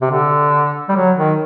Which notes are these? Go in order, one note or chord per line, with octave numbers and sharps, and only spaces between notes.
C3
D3
G3
F#3
D#3